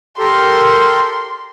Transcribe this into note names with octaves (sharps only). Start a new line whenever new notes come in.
G4 A4 A#4 C6